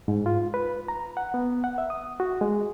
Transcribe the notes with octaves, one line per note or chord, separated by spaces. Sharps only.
G#2
F4
B4
A#5
F#5
B3
F#5
E5
D#6
F#4
G#3